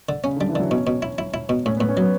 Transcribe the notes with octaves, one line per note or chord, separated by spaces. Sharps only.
D3
C#3 C#4
D3
G3
E3
D3 F#3
B2 C#4
B2
E4
E4
E4
B2
A2 C#4
B3
A2
C#4
F#3 B3